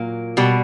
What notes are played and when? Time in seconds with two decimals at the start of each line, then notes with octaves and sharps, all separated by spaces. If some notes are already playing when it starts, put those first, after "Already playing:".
Already playing: A#2 F#3 A#3
0.37 B2 G3